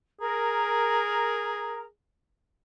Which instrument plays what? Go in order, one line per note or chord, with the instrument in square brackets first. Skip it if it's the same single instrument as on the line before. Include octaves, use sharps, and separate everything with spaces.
[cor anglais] G#4 [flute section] A#4 A#5